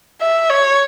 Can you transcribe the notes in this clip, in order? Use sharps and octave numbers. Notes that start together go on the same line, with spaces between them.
E5
C#5